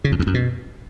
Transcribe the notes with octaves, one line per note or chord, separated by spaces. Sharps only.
C#3
F2
E2
F#2
B2